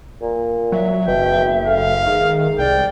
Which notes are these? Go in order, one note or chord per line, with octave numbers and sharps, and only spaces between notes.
A#2
F#3 E5
F#1 B2 G5
A3 F5
G#2 D#3
C2 D5 G5